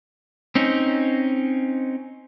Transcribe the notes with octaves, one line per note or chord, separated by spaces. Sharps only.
C4 C#4 D#4